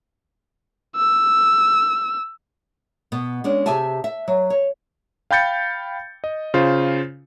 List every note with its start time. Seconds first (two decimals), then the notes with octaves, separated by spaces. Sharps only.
0.96 E6
3.12 B2 B3
3.44 G#3 C#4 D4
3.66 C3 G4 G#4 E5 G#5 A5
4.04 E5
4.28 F#3
4.50 C#5
5.31 F5 G5 B5 G6 A6 C#7
6.24 D#5
6.54 C#3 F4 C5